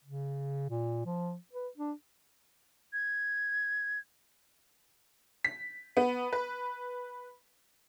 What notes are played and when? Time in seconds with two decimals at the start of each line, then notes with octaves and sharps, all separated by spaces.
0.04 C#3
0.70 A#2
1.06 F3
1.53 B4
1.78 D4
2.93 G#6
5.45 B6
5.97 B3
6.33 B4